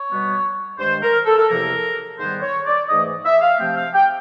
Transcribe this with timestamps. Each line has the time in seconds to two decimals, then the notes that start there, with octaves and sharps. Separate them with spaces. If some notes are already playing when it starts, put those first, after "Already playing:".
Already playing: C#5
0.09 B2 G3 B3
0.78 G2 D#3 G#3 C5
1.02 A#4
1.26 A4
1.38 A4
1.49 E2 C3 F3 A#3 A#4
2.19 G#2 D#3 G3 B3 C5
2.42 C#5
2.65 D5
2.88 G#2 E3 A3 D#5
3.24 E5
3.41 F5
3.58 C3 F3 A3 C4 G5
3.76 F5
3.94 G5